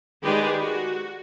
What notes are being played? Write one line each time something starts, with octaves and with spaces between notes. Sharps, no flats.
D#3 G#3 G4 G#4 B4 D5
F#4